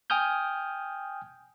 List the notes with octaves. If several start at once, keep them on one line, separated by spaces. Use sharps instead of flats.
G5 G#5 D#6 F6 G6